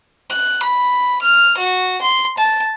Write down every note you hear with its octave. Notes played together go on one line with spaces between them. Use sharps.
F#6
B5
F6
F#4
C6
A5